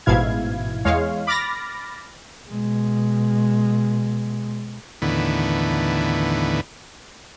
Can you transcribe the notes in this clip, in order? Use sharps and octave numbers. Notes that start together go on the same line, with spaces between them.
A1 G#2 B2 E4 F5 G#6
E2 G#3 C#5 F5
B5 D6 F6 A6 A#6
B2 G#3
D#2 A2 D3 E3 B3